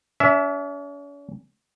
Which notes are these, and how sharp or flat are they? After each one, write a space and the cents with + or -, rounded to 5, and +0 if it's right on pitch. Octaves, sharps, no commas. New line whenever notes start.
C#4 +45 E5 +0